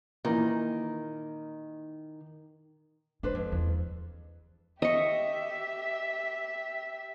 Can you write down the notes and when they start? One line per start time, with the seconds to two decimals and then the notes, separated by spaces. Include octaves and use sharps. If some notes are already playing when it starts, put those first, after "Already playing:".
0.25 A#2 D#3 E3 A#3
3.23 G#3 D4 B4 C5
3.35 F2
3.52 E2
4.82 G4 D#5 E5 C#6